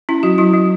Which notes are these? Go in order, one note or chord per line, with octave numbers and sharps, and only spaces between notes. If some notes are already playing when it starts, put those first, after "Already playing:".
C#4 E4
F#3 F#4
F#3 E4
F#3